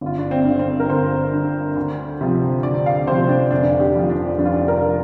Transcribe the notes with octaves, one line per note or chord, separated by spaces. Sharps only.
G1 F4
D4
C4
G2 D3
C4
A#4
G1 C5
G2 D3
D2
C3 F3
D2 D5
F5
C3 F3 C5
C4
D4
F1 D4
G4
F2 F3
D4
F1 D4
F4
D4
A#4
F3